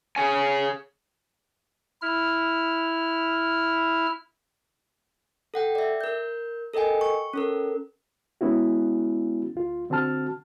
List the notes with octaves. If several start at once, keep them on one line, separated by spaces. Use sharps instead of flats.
G#4 C#5 G#5
E4 F6
A4 F#5 G5
D5 E5
A#4 G6
A4 A#4 D#5 G5 G#5
C#6
C#4 A4 A#4
G#3 B3 C#4 E4 F#4
D2 F4
D3 C4 F#4 A5 F6